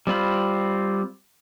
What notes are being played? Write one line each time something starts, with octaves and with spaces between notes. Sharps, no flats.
G3 C4 F4 B5